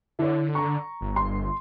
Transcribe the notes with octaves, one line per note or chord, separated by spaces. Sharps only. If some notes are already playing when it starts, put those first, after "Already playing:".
D3 E4 C#5
A#5 C#6
G1
C6